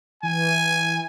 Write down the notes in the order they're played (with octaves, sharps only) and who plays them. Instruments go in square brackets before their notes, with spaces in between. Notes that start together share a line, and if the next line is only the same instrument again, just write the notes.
[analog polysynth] E3 [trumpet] G#5